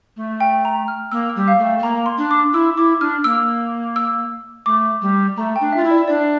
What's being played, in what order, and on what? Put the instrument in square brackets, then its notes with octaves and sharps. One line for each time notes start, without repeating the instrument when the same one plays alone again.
[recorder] A3
[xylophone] G5
A#5
F6
[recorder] A#3 [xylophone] E6
[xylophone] E6
[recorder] G3
[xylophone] F5
[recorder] A3
[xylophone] G5
[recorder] A3
[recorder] A#3 [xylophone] A#5
[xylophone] C6
[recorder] D4
[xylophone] D6
[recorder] E4 [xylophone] E6
[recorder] E4 [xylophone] D6
[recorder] D4 [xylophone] F6
[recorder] A#3 [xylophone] E6
[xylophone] E6
[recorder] A3 [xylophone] D6
[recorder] G3
[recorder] A3 [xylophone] A#5
[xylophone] G5
[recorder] D4
[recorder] F4 [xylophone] E5
[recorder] E4
[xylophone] D5
[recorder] D4 [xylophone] D5